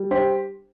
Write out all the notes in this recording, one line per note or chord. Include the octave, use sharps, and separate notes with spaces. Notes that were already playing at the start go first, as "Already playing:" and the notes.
Already playing: G3
G4 C5